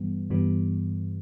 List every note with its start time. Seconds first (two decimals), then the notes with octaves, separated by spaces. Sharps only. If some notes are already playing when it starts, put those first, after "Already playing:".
Already playing: G2 E3 G3 B3
0.30 G2 E3 G3 B3